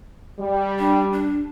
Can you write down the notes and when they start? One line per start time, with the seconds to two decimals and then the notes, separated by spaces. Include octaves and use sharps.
0.38 G3
0.79 D4
1.13 D4